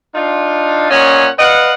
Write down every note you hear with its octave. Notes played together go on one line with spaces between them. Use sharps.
D4 D#4 F4
A#2 C#4 C#5 D#5 F#5
B4 D5 D#5 F5 F#5